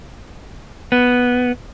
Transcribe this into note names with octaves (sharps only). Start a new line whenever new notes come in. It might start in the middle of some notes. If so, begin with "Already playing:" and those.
B3